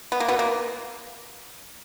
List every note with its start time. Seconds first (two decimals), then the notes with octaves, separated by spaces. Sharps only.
0.12 B3
0.20 A#3
0.28 B2 B3
0.39 A#3